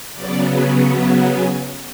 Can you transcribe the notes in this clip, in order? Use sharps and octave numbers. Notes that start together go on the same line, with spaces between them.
C#3 F#3 B3 D5
E5
G#5